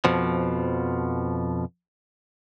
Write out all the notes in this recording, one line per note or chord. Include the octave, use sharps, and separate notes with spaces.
F2 B2 F3